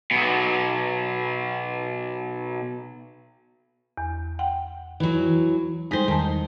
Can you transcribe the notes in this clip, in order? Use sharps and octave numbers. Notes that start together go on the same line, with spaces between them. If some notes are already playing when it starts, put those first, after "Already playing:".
B1 B2
E2
F#5 G5
E3 F#3
G3 G#3 D#4 G#4 C5
E2 D#3 A5